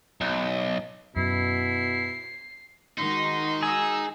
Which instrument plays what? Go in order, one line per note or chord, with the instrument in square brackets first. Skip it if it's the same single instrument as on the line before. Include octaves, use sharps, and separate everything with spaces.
[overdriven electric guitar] B1
[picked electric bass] F#2 [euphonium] B2 [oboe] E4 [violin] C7
[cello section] D#3 G#3 F#4 [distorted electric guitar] D#4 [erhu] C6
[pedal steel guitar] G#4 [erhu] E6